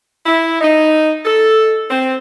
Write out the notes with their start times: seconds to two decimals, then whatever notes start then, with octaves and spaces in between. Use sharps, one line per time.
0.25 E4
0.61 D#4
1.25 A4
1.90 C4